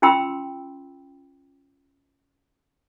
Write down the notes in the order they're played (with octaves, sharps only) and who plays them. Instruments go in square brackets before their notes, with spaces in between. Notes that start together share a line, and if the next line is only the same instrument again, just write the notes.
[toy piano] C#4 F4 G5 B5 C6 E6